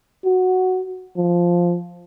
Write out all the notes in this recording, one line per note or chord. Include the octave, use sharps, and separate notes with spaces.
F#4
F3